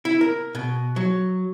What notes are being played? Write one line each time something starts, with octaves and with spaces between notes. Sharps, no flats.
E4
A#4
B2
F#3